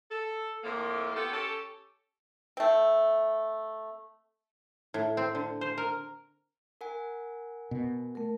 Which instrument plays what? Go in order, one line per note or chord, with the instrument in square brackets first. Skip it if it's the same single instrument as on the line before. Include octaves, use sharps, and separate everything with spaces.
[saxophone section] A4
F2 A2 A#3
B3 F4 G4 A4
C#4 G4 A4
[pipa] A3 C4
[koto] A2
C4
D3
C5
A#4
[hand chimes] A#4 F#5 G#5
[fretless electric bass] B2
[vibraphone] A3 A#4